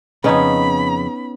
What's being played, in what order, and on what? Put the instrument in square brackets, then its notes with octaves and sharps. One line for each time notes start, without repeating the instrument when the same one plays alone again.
[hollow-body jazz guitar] F2 C#3 [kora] B3 C#4 D#4 [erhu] B5